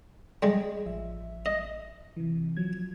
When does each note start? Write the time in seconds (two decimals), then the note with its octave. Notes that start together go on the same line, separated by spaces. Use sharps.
0.43 G3 G#3 G#4 D#5
0.85 A1 F3 E5
1.46 D#5
2.16 C3 E3
2.57 F3 F#3 G#6